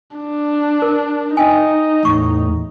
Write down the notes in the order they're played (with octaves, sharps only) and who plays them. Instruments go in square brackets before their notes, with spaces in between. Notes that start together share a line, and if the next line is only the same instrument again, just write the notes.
[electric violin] D4
[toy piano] A#4
[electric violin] D#4 [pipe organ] D#5 [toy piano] G5 G#5
[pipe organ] E2 A2 [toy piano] C#6